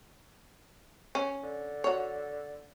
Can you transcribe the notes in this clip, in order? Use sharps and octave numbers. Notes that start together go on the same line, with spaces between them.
C#4
D3
F#4 C#5